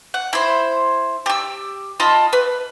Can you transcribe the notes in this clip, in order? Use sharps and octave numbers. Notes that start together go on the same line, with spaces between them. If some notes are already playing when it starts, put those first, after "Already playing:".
F#5
E4 C5
G4 E6
F4 D#5 A5 B5
B4